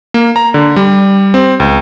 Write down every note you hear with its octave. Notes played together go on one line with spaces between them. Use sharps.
A#3
A#5
D3
G3
C4
C#2